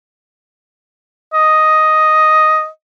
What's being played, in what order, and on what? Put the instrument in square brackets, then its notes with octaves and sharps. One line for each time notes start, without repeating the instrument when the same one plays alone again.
[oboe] D#5